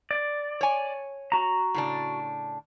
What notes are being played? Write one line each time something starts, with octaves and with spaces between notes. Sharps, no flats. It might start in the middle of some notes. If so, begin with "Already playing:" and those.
D5
C#5 G#5
F#4 A#5
A2 C#3 D4